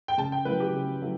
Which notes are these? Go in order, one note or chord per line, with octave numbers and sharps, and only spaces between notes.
G5
C#3 A5
G5
F#3 A3 E4 B4
G4
C#3
F#3 A3 E4